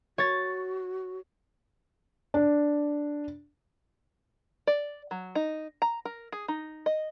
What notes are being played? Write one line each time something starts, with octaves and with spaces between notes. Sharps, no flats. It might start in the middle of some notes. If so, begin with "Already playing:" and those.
F#4 C#5 A6
D4
D5
F#3
D#4
A#5
A#4
G#4
D#4
D#5